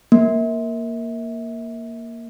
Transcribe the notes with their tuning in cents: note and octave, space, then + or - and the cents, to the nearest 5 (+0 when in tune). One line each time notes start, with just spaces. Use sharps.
A#3 +0